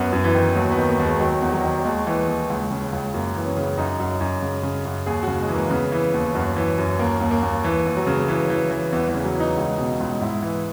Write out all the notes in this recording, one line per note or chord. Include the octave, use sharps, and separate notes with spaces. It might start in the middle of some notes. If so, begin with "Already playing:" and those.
Already playing: F#2 B3
F#2
E3
D#3
D#2 F#3
B3
D#3
A#3
D#2
G#3
D#3 F#3
E2
F#3
D#3
F#3
D#2 G#3
E3
D#2
C#2
C#3
C#2
F#2 A#3
E3
C#4
C#3
F#2 D#4
F#2
F#2
C#3
C#3
F#2
D#2 G#4
C#3 F#4
G#3
E3
A#3
C#3 B3
E3
D#2
F#2
E3
F#2
D#2 A#3
D#2
A#3
D#2
E3
D#2
F#3
C#3
E3
E3
E3
E2 E3
E3
C#3
F#3
E3
D#4
C#2
B2
C#2
G#2 E4
E3